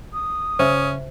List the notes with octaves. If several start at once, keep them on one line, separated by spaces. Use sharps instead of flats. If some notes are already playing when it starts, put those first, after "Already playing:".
D#6
C#3 C#4 C5 E5